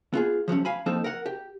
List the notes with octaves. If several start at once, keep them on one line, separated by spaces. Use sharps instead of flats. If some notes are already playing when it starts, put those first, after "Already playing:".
B3 F4 G#4
F3 F#3 A3 C#4
F5 G#5 B5
F3 A#3 C4 D#4 A4
A#4 F#5
G4